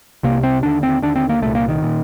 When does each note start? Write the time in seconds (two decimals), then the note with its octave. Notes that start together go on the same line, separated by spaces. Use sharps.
0.23 C2 C3 A#3
0.43 C4
0.63 D#2 D3 D4
0.83 C4
1.02 D#2 D3 D4
1.16 C4
1.29 A#3
1.42 C2 A#2 A3
1.55 A#3
1.68 D#3
1.82 A#2